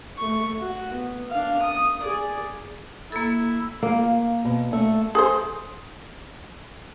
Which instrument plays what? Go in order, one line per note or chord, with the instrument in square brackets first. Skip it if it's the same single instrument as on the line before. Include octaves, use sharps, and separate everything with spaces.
[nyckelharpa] A3 C#6
F#4
B3
D4 F5
D#6
G#4 D5
[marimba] A#3 A4 [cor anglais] E4
[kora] A#3 [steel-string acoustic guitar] F4 F5
[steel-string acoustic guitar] B2
A3 A4 E5
[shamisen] G#4 A4 C5